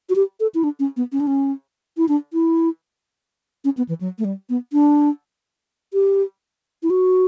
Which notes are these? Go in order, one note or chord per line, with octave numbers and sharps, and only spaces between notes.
F#4
G4
A4
E4
D4
C#4
B3
C#4
D4
C#4
E4
D4
E4
C#4
B3
E3
F#3
A3
G3
B3
D4
G4
E4
F#4